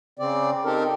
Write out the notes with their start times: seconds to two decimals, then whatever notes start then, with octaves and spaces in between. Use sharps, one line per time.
0.19 C#3 C4 D5
0.65 C4 D#4 G4 A4 A#4